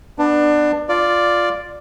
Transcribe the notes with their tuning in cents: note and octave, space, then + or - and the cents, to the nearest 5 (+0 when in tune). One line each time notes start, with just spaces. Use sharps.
B3 +0 D4 +20
F4 +0 D5 +0